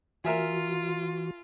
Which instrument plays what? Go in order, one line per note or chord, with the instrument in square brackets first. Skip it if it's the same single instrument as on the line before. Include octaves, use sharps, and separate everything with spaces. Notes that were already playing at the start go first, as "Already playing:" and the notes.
[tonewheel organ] E3 F#4 [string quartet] F4 [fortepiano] A#4 E5 G#5